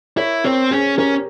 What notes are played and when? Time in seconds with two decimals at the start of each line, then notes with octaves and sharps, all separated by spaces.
0.17 E4 A#4 C#5
0.44 C4 A#4 C#5
0.71 C#4 G#4 C5
0.98 C#4 G4 A#4